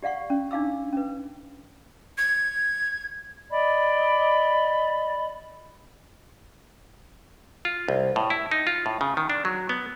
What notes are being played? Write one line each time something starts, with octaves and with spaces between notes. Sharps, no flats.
G4 D5 F5 F#5 C#6
C#4
D4 D#4 F5 D6 E6
C#4 B4
G#6
D5 D#5 B5
F4
C2
A2
E4
D#4
F4
A2
C#3
D#3
D4
F#3
B3